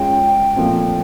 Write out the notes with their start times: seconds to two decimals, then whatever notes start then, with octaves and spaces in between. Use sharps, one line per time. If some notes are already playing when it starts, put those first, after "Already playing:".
Already playing: G#3 C#4 F4 G5
0.56 A#2 F3 A3 C4